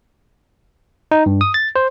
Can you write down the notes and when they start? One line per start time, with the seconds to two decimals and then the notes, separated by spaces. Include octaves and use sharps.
1.11 D#4
1.26 G2
1.41 D#6
1.54 A6
1.76 C5